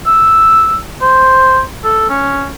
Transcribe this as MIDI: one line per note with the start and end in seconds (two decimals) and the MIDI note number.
0.06 0.75 88
1.02 1.61 72
1.84 2.07 69
2.09 2.49 61